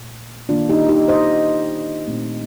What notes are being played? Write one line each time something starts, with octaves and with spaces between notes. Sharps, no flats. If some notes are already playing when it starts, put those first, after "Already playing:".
Already playing: A#2 A3
D#3 A#3 D4 F4
D#4 G4
D#4 G4
C5 D#5
A#2 A3 C4